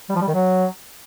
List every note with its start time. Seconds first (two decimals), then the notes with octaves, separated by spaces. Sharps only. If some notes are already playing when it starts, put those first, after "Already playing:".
0.10 G3
0.16 F3
0.22 G3
0.28 D#3
0.34 F#3